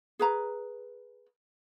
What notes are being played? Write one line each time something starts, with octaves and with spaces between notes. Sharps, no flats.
G#4 B4 A#5